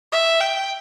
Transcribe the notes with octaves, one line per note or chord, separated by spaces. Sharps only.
E5
G5